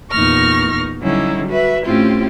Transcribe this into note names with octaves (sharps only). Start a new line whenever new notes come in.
E2 A#2 D#4 C#6 F6 A#6
D3 F#3 G3 C#4 D#4 E4
F#4 B4 E5
A2 C4 C#4 E4 F4 G4